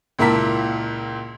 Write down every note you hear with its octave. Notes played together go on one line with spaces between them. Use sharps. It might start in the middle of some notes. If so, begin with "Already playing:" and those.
C#2 A#2 E4 A#4 A5 B6